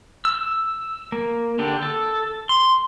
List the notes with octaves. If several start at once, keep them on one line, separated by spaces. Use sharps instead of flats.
E6
A#3
D3 D4 G4
A4
C6